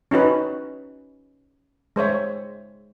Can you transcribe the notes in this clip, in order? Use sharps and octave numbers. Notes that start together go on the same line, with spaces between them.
C#4 D#4 F#4 B4
G#3 C5 C#5 E5